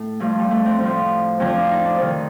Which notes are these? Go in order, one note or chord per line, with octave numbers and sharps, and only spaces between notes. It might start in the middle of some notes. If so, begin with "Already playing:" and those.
Already playing: A2
G2 F3 A3
G3
A3
C4
A2 F3 C4
F2 D3 F3 C4
D4
D#4
D4
F2 C3 D#3